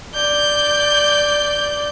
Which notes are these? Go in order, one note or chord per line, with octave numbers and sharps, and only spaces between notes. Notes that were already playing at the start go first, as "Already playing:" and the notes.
D5 G6